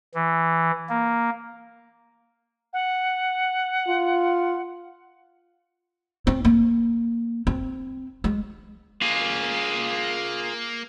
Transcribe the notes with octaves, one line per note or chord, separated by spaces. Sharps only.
E3
A#3
F#5
F4
C4
A#3
C4
G#3
A#3 F4 G#4